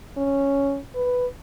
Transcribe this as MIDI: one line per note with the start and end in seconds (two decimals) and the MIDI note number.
0.17 0.79 61
0.95 1.26 71